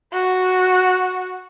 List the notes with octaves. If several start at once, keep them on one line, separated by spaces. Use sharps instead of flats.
F#4